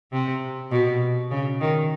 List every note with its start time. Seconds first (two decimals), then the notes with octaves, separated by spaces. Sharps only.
0.12 C3
0.71 B2
1.31 C#3
1.60 D#3